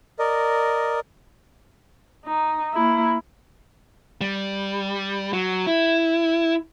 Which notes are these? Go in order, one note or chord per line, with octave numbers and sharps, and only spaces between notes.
A#4 D5 D#5
D#4
A#3 E4
G3
F#3
E4